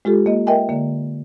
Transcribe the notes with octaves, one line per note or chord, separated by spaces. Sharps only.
G#3 F4 G4 A4
A#3 D#5
A#4 D#5 E5 G5 G#5
D3 A#3